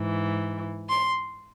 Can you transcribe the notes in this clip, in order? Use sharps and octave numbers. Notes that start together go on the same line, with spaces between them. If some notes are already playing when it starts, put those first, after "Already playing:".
Already playing: G#2 E3
C6